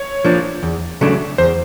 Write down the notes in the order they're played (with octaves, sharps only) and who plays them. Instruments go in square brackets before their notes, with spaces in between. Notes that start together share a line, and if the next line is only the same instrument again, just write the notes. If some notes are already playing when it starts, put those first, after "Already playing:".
Already playing: [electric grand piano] C#5
[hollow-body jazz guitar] F3 A#3 D4
E2
C#3 F#3 A3 D4
[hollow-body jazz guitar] E2 [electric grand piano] C5